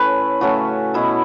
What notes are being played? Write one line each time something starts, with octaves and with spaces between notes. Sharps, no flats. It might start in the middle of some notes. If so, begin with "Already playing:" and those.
Already playing: A2 A3 C#4 B4
C#3 F#3 A3 C#4 F#4
B2 B3 E4